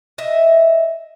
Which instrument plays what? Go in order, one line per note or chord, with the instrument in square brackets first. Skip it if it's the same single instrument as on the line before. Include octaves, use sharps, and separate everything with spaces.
[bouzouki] D#5 E5